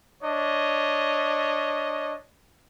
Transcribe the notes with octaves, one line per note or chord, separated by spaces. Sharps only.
D4 C#5 D#5